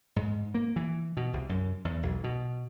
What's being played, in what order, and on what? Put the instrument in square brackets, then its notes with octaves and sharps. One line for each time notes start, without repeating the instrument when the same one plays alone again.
[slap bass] G#2
A#3
E3
B2
C2
F#2
E2
B1
B2